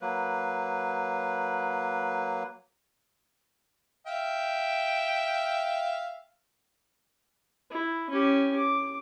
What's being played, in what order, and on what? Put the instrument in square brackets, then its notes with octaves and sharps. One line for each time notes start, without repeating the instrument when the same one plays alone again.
[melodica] F#3 A#3 B4
[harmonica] E5 F5 G5
[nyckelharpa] E4
C#4 G4
D6